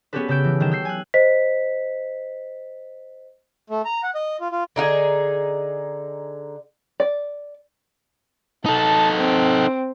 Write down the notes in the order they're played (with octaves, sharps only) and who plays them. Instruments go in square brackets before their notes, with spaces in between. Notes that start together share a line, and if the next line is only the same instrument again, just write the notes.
[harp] B3 C#4 F#4 G4 A4 B4
C#3 A5 E6 G6 D7
E3
D#3 F#3 G5 E7
E6 G6 C7
G#5 F#6
[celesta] C5 D#5 B6
[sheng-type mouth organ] A3
A#5
F#5
D#5
F4
F4
[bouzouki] D3 D#4 F4 G#4
[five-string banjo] D5
[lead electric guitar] D#4 A4 [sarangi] A5
[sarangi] C4